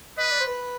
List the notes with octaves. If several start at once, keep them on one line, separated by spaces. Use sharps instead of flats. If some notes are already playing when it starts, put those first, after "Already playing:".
B4 D#5
D5
C5
B4